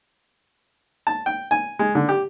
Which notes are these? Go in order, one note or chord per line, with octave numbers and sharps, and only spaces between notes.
A5
G5
G#5
G#3
D3
G4